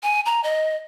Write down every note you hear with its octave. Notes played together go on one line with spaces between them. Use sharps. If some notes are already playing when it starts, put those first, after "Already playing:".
G#5
A#5
D#5